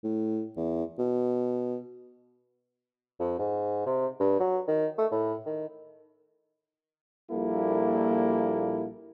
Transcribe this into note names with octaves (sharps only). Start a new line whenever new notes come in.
A2
E2
B2
F2
G#2
C3
G2
F#3
D#3
A3
A2
D#3
A#1 A#2 G3 A#3 E4 A4